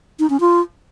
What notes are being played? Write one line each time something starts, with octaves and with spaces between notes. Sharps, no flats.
D#4
C#4
F4